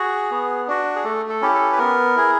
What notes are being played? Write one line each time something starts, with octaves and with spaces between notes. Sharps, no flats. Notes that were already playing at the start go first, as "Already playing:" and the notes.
Already playing: F#4 G#4
B3
D4 F#4
G#4
A3 A4
A4
C#4 E4 G4
A4
B4
B3 A#4
E4 G#4